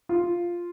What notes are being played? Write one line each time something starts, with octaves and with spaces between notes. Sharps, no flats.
F4